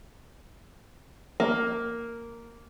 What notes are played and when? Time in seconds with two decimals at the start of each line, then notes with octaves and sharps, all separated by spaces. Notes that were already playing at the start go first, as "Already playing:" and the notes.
1.40 A#3